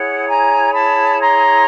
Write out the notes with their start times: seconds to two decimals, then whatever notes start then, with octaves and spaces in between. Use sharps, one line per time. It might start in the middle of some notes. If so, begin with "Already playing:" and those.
Already playing: E4 G#4 C#5 F#5
0.28 G#5 A#5
0.73 A5 B5
1.20 A#5 C6